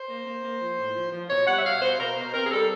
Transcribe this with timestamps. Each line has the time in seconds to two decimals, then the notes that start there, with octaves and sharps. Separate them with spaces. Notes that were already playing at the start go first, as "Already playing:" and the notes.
Already playing: C5
0.08 A#3
0.26 A#3
0.43 A#3
0.60 F3
0.78 A2
0.95 F3
1.12 F3
1.30 B2 C#5
1.47 G3 F#5
1.57 E5
1.64 B2 F5
1.81 B2 C5
1.99 B2 A#4
2.16 B2 C5
2.33 C4 A#4
2.45 G#4
2.51 G3 A4